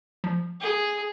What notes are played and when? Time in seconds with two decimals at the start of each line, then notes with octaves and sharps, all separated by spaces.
0.24 F3
0.60 G#4